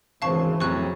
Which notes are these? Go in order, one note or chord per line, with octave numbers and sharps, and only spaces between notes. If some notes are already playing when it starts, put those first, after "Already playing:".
G#1 D2 C#3 E3 C4 F5 A5 C#6
F2 A2 C3 F#3 C#6 F#6